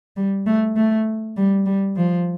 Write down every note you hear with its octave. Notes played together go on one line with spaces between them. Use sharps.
G3
A3
A3
G3
G3
F3